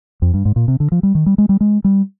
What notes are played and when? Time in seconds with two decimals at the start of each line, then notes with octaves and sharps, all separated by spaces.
0.22 F2
0.34 G2
0.45 G#2
0.56 A#2
0.68 C3
0.80 D3
0.92 F3
1.03 G3
1.15 D#3
1.26 G3
1.38 G#3
1.49 G3
1.61 G#3
1.84 G3